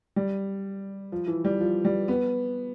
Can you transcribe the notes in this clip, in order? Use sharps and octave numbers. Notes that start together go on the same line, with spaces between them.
G3
F3
E3
G3
F3
G3
B3